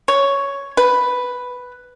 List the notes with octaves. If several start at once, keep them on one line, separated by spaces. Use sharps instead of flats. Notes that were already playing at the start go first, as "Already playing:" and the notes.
C#5
B4